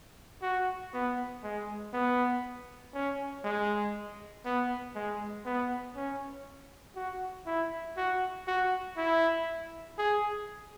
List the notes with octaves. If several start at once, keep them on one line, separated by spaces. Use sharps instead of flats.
F#4
B3
G#3
B3
C#4
G#3
B3
G#3
B3
C#4
F#4
E4
F#4
F#4
E4
G#4